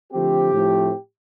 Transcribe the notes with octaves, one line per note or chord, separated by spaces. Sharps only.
D3 F3 A3 C4 G4
A2 F3 A3 C4